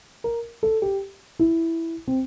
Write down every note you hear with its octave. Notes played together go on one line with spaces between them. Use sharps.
A#4
A4
G4
E4
C4